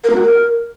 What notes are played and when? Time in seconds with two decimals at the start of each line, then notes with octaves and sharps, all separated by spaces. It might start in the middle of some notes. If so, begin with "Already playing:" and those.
0.03 A#4
0.09 A#3
0.15 F#4
0.21 A#4